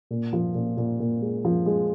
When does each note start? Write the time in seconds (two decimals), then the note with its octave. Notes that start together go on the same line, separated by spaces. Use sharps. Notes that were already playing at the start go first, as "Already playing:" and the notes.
0.11 A#2
0.33 F3
0.55 A#2
0.77 A#2
1.00 A#2
1.21 G#3
1.45 F3
1.66 G#3